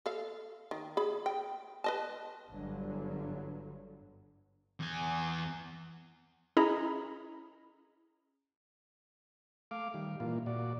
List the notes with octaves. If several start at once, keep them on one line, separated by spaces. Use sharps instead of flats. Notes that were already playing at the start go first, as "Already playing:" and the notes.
A4 F5
D#3
G#4 B5
G5
B4 D#5 A5
G1 G2 D3 F#3
E2 G#5
C#4 E4 G#4 D#5 A#5 B5
A3 F5 D6
D#3 G3
A#2 E3 A#3 F4
A#2 F#4 D5